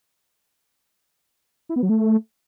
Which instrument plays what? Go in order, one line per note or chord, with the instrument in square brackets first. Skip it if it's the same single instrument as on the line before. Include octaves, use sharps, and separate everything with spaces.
[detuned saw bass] E4
B3
F#3
A3